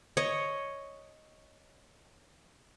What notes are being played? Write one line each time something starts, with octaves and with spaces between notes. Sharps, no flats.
C#5 D#5